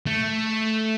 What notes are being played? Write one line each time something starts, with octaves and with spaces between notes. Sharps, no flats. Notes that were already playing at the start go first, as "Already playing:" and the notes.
A3